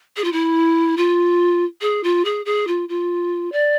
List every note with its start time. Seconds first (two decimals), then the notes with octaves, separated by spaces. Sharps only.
0.17 G#4
0.24 F4
0.32 E4
0.97 F4
1.81 G#4
2.03 F4
2.25 G#4
2.45 G#4
2.67 F4
2.89 F4
3.52 D5